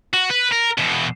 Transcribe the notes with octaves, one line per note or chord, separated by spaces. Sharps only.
F#4
B4
A#4
E2 B2